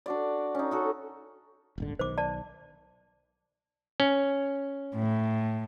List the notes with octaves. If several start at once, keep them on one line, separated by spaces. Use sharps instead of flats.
D4 F#4 D5
C#4 D#4
D#4 F#4 A4
D#1 G#1 D3
B1 D#3 C5 D6
D5 A5
C#4
A2